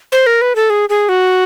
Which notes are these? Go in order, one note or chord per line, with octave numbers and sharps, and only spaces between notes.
C5
A#4
B4
A4
G#4
G#4
F#4